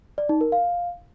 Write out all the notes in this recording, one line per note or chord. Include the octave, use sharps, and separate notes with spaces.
D5
D#4
A#4
F5